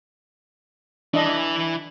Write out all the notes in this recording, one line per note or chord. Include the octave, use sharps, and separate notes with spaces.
E3 D4 E4 D#5